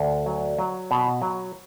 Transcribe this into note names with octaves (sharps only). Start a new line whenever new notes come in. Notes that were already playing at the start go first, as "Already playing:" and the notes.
Already playing: D2 D3
F#3
F#3
B2
F#3